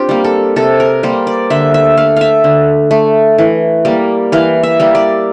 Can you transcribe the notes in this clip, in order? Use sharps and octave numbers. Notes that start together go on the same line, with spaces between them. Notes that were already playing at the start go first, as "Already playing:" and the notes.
Already playing: C4 D4 F4 G4
G3 A#3
A4
C3 A4
A#4
G3 A#3 C5
D5
D3 E5
E5
A3 F5
E5 F5
D3
A3
E3
G3 A#3
E3 F5
E5
G3 A#3
D5